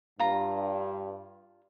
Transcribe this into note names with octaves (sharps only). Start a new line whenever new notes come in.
G2 F4 A#5